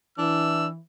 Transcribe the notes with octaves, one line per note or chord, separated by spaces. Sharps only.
E3 D4 E6